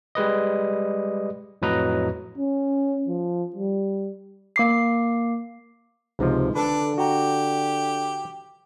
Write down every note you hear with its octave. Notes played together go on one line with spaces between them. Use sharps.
G3 G#3 B4 D#5
F2 A2 F#3 B4 D#5 A#5
C#4
F3
G3
A#3 D6 C7
C#2 G#2 C3 F3
D3 D4 A4 B4
F#4 G4 A#5